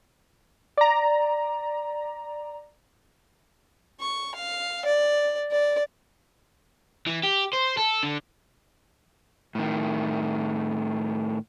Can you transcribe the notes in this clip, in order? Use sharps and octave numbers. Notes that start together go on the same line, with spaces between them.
D5 A#5
C#6
F5
D5
D5
E3
G4
C5
A4
D3
A2 D#3